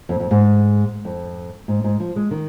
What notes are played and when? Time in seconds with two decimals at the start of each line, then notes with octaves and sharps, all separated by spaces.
0.09 F2
0.20 F2
0.31 G#2
1.05 F2
1.68 G#2
1.84 G#2
2.00 F3
2.16 G#3
2.31 D#3